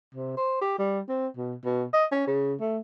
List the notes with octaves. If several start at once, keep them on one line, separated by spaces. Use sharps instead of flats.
C3
C5
G4
G3
C4
B2
B2
D#5
C#4
C#3
A3